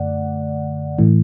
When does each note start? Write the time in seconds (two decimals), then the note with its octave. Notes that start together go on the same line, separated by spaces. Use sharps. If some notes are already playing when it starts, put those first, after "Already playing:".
Already playing: F#2 D3 A3 D5 F#5
0.98 A2 E3 A3